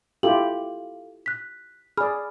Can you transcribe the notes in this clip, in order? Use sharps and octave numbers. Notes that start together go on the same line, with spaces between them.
E4 F4 G4 A4 F5 F#7
F#6 B6
G#4 D5 B5 F6